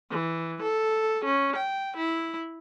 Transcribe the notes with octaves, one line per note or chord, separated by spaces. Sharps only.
E3
A4
C#4
G5
E4